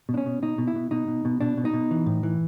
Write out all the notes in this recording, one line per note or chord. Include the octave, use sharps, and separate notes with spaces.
B2
D4
C#4
B2
B2 D#4
B2
E4
B2
B2 D#4
B2
B2
B2 D4
B2
D#4
B2
E3
A2
E3